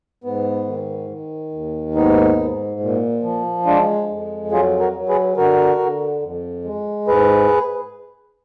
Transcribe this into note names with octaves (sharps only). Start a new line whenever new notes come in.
G#2 B3
D#3
D#3
D#2
G#2 B3 D#4
G#2
A#2
F3
G#3 D4 F4
F2
F#3 F4 G#4
F#4 A#4
F#3
G#4 B4
D3 F#4 A#4
D3
F2
G#3
G#2 G#4 B4